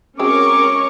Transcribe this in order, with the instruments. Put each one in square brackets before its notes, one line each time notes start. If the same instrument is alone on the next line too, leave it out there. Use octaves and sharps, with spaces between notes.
[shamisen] F#3 G#3 C4 [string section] C#4 A#4 C#6 [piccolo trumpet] D6